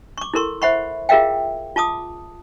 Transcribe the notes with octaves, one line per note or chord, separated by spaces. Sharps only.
C#6 D6
E4 A4 A#4 C6 C#6
C5 E5 F#5 B5 C#6
F4 G#4 A#4 E5 F5 G5
F4 A5 D6 D#6